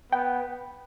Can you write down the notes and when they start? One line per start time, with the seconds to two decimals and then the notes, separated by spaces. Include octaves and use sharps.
0.12 B3 G5